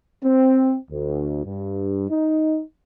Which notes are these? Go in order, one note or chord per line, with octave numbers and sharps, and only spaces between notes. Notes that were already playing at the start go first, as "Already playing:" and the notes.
C4
D2
G2
D#4